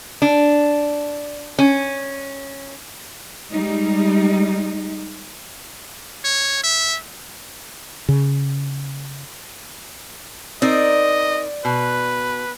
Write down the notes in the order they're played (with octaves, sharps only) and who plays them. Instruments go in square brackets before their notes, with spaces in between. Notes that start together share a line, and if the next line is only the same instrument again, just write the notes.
[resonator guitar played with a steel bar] D4
C#4
[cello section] G3 G#3 D#4
[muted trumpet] C#5
E5
[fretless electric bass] C#3
[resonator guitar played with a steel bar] C4 D#4 A#4 [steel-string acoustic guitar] D5 [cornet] D#5
[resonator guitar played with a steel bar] B2 [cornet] B4